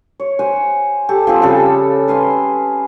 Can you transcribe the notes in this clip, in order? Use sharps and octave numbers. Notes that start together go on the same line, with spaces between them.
C#5
C5 F#5 G#5
G4 A4
F3 C4 G#4
C#3 G3 G#4 A4
B4 F5 G#5 C6